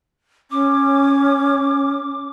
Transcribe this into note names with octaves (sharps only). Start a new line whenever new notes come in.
C#4 D6